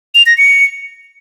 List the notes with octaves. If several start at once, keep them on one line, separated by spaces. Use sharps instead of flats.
F7
A#6
C#7